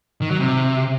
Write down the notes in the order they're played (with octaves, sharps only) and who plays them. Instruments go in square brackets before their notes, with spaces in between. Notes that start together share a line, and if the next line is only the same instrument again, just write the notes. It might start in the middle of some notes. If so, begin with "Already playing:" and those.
[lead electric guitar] D#3
F#3
C3